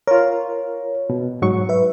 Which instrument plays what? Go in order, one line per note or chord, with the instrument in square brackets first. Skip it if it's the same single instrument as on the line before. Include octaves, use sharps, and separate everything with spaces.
[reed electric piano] F4 A#4 [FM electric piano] C#5
[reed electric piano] B2
G#2 F#3 C#6
[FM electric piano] B4 E5